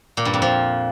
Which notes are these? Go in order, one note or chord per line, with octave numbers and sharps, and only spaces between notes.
A#2
G2
F2
F3